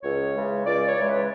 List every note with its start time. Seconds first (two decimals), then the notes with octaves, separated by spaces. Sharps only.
0.02 C#2 C#5
0.35 C#3 E3 G#3
0.66 C#2 D5
0.87 C#5
0.97 C#3 E3 G#3
1.07 B4